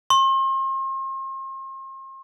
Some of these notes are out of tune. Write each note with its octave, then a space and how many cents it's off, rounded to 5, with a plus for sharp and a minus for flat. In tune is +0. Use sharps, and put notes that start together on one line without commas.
C6 +40